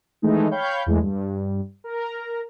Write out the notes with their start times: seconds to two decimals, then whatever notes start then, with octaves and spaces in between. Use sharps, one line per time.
0.22 D#3 E3 G#3 A3 D#4
0.51 C#5 F5 G5 B5 C#6 G6
0.86 E2 E3 G#3 A3
1.01 G2
1.84 A#4 A#5